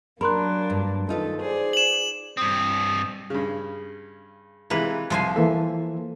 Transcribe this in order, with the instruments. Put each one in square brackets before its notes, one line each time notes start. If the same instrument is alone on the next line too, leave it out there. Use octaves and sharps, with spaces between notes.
[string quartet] F#3 A#3 D4 [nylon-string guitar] A#4 [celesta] B5 C6 F#6
[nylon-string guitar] G2
[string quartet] D#3 A4 [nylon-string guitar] D#4 F4 B4
[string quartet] G#4 C5 D5
[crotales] E7 F#7
[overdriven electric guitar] G2 C4 [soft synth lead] D#6
[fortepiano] G2 C#3
[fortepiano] C3 E3 G#3 [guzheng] A#3 B4
[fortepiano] C2 A5 [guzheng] F3 C5 G#5
[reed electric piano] E3 A#3 A4 [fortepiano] E5